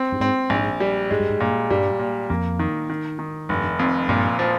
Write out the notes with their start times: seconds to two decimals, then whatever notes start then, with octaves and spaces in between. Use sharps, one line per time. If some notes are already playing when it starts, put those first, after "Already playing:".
Already playing: C4
0.12 G2
0.20 G#2 C4
0.50 A#1 G#2
0.80 G3
1.10 G#2 G#3
1.20 G2
1.30 G#2
1.40 G2 A#2
1.70 G2 G3
1.99 A#2
2.30 F2 A#3
2.59 D#3
2.90 D#3
3.19 D#3
3.49 F1 G2
3.79 F2
4.08 G2 A#2
4.39 F3